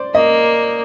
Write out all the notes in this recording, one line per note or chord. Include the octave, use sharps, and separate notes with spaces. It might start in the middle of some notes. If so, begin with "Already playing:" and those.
Already playing: C5 D5
A#3 D#5